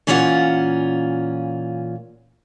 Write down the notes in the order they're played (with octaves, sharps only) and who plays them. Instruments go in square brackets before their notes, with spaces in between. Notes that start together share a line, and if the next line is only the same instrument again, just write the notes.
[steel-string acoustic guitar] A#2 E3 C#4 E4 F4 F#5